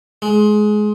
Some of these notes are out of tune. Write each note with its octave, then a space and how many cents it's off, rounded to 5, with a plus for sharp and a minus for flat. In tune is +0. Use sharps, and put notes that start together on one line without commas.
G#3 +20